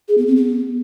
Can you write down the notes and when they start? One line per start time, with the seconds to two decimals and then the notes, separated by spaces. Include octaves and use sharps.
0.08 G#4
0.18 B3
0.27 C4
0.36 B3